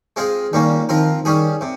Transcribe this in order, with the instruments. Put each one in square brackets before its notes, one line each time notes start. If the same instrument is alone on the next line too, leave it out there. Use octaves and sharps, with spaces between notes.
[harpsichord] G#3 C4 F4 G#4
[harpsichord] A#2 G3 A#3 C#4 [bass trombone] D#3
[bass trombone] D#3 [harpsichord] F3 C4 F4 A#4
[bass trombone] D#3 [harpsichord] G3 C#4 G#4
[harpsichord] C3